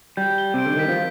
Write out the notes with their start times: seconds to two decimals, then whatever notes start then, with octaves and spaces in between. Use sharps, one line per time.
0.17 G3 G6
0.38 G7
0.54 C3 D7
0.66 D3
0.76 D#3 B6
0.88 F3